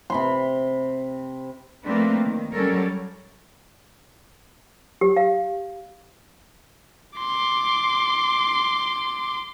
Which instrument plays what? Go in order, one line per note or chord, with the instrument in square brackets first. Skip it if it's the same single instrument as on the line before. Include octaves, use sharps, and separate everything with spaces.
[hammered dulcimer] C3 B5 C6
[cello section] F3 A3 A#3 C4 D4 B4
D#3
F#3 G3 C#4 A4 A#4 C#5
[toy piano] G4
F5
[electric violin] C6 D6